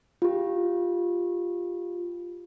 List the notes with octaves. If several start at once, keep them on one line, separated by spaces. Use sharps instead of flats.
F4 G4